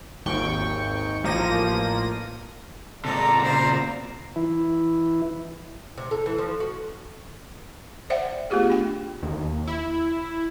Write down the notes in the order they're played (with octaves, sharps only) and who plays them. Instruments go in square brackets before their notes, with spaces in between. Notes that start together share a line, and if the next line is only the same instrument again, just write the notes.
[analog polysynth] G#1 D#2 G5 C#6
A1 F3 A#3 A#6 D#7
[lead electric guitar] G#2 C3 [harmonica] A4 [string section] D5 A#5
[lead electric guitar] A#2 C#3 [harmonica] C5
[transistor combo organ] E3 E4
[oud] C3
A4
E3
F3
F#4
[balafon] C5 D5 E5 F#5 G5
A3 B3 F4 G4 G#4
D4 G5
[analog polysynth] D#2
E4